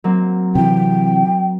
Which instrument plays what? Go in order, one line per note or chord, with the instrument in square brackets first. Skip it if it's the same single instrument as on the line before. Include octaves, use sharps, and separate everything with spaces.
[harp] F#3 A#3 C4
[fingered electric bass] C3 E3 [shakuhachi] G5